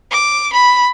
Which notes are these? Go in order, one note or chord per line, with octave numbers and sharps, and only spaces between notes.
D6
B5